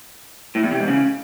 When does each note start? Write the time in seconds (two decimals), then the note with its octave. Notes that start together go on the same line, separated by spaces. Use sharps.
0.55 A2
0.63 E2
0.71 C3
0.80 G#2
0.88 C#3